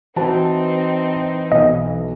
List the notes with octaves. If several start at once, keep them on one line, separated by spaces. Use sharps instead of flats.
E3 C4 D#4 F#4 C5 A5
B1 D#5